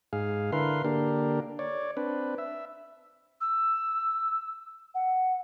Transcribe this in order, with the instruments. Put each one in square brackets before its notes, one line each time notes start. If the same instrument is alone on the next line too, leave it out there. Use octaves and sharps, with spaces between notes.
[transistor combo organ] G#2 G#4 F5
D3 E4 A#4 B4 F5 C6
D3 A#3 D4 G4 A#4
C#5 D5
C4 D4 B4
E5
[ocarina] E6
F#5